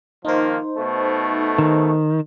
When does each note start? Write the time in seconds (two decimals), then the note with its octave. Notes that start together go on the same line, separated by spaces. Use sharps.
0.25 D#3 F3 A#3 D#4 C5
0.76 B2 A3
1.58 D#3